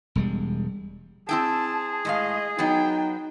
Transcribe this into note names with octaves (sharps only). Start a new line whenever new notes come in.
E1 G3 G#3
C4 E4 G#4 G5 A5
A2 G#3 D#5 F5
F#3 B3 D#4 G5